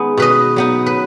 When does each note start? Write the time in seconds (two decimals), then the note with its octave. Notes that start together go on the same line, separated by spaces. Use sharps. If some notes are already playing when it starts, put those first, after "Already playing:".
Already playing: G#3 B3 D#4
0.17 B2 B4 D#5
0.56 F#3 B3 D#4
0.86 B4